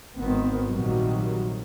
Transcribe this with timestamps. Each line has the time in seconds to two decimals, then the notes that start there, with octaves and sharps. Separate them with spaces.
0.16 G#1 D#3 B3 C4
0.70 A#1 C3 D#3 F#3 G3